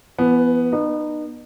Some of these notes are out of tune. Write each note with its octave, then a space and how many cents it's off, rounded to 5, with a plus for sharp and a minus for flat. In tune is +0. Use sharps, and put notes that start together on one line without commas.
E3 +40 B3 +0
B3 -30 D#4 -35